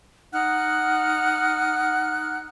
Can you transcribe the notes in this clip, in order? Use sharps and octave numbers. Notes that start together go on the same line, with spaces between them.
D#4 F#5 F6 F#6